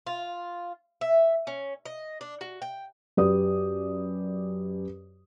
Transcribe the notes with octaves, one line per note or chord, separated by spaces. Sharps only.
F4
E5
C#4
D#5
D4
F#4
G5
F#2 G4 B4 D5 D#6